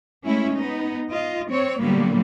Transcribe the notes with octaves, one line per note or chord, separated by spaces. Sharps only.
G#3 A3 C#4 E4
B3 D#4
F4 D#5
C4 C#5
A#2 D3 F#3 G3 A#3 B3